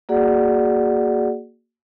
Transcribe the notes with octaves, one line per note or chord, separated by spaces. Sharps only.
A#3 F#4 G#4 D5 F#5